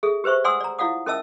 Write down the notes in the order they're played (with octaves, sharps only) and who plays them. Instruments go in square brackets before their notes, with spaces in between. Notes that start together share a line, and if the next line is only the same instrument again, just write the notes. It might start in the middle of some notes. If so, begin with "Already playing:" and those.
[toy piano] G#4 A4 E5
G4 B4 C5 E5 C#6
D5 F#5 G#5 C6 D#6 E6
D5 A#5
E4 F4 D5 F5 F#5 D#6
C#4 A#4 D#5 E5 A5 E6